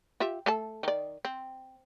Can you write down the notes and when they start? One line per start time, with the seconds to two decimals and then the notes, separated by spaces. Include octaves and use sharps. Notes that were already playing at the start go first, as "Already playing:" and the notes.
0.20 F4 G4 E5
0.46 A3 A4 A5
0.83 D#3 D5
1.25 C4